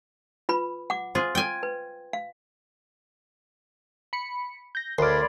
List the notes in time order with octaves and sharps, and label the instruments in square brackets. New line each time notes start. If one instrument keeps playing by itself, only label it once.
[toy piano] F4 B4 B5
F#5 D6
[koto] F4 G#4 [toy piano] C5
[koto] G5 G#5
[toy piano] B4
F5
[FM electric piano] B5 C#7
G6 A#6
[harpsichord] D2 [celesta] A#4 F6 [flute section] C#5 D5 B5 [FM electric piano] C6 D6